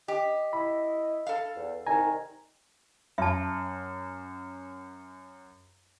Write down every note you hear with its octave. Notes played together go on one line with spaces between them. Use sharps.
G4 D#5
E4 D#5 B5
A4 F5
E2
C2 D#3 G#5 A#5
F#2 E5 A5